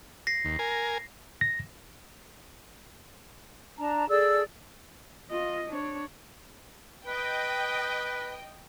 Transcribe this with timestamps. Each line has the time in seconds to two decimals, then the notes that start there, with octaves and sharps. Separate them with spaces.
0.27 A#6 C7
0.45 D#2
0.59 A#4 G#5
1.41 A#6
3.78 D4 A5 A#5
4.09 G#4 A4 D5 E6
5.30 F4 D#5
5.69 D4 C#5
7.07 B4 D#5 G5